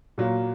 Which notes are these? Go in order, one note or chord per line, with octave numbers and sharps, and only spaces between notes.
A#2 F#3 A#3